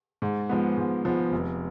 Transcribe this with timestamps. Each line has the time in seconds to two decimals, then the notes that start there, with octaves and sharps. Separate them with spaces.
0.22 G#2
0.49 F3 G#3 B3
0.77 G#2
1.05 F3 G#3 B3
1.32 F1